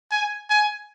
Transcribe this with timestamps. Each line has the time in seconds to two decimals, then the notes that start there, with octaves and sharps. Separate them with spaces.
0.11 G#5
0.50 G#5